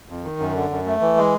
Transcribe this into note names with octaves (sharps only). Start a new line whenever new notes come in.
F2
D#3
F#2
D3
F#2
A3
E3
G#3